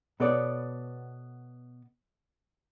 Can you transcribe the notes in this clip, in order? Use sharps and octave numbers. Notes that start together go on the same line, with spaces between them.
B2 B3 A4 C#5 D5